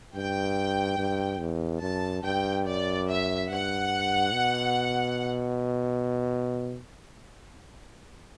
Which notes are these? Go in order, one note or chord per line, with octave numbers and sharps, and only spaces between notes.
G2 G5
G2
E2
F#2 A5
G2 G5
F#2 D5
E5
G2 F#5
B2